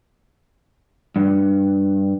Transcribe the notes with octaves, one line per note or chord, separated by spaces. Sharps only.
G2